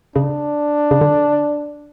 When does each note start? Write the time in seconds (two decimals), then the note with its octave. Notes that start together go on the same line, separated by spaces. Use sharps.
0.16 C#3 D4
0.91 C#3
1.01 D3